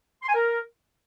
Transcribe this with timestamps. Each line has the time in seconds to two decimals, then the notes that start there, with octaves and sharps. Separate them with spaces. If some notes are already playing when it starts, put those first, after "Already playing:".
0.22 C6
0.28 G#5
0.34 A#4